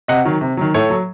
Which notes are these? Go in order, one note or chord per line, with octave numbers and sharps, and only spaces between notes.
C3 D#5 F#5
D#3 F#3
C3
D#3 F#3
A2 A4 C#5
F#3